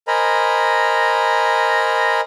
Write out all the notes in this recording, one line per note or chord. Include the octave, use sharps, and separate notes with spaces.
A#4 C5 D#5 G#5 A#5 B5